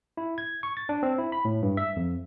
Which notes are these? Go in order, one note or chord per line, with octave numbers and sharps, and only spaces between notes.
E4
G#6
C#6
A6
D4
C4
E4
B5
A2
G2
E5
F2